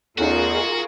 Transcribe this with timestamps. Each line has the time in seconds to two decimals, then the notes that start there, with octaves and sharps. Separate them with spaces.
0.18 E2 A3 C#4 D#4 F4 F#4 G#4 A#4